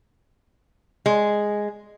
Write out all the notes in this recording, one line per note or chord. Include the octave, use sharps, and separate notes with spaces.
G#3